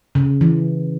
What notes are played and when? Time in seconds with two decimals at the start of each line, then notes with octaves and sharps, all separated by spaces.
0.15 C#3
0.41 E3